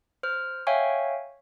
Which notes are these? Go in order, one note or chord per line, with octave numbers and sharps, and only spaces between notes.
C5 F6
C#5 E5 F5 G5 G#5 C#6